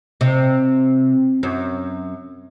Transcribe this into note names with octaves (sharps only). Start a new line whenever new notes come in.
C3
F#2